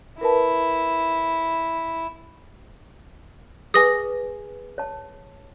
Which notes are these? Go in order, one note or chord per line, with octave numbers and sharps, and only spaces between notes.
E4 A#4 B4 A5
G#4 B4 G#5 D#6 A#6
C#5 A5